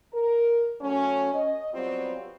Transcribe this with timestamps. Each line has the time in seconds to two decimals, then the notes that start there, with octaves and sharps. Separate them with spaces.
0.12 A#4
0.80 F#3 A3 C#4
1.34 D#5
1.73 F#3 G3 B3 C4 F4